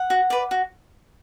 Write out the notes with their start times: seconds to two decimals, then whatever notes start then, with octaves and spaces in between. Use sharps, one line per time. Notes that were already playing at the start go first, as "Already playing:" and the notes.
Already playing: F#5
0.10 F#4
0.30 B4 D5
0.51 F#4